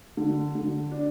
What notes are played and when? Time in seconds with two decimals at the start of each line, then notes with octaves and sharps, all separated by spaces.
0.17 D3
0.55 D3
0.92 D4